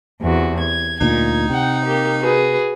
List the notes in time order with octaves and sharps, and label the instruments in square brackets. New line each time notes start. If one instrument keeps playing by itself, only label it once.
[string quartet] E2 C3 F#4
G#6
[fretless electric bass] D2 A#2 [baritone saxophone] D#4 [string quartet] G#6
[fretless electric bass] C3 [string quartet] F#5 G5
[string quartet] A#3 G4
F#4 G#4 B4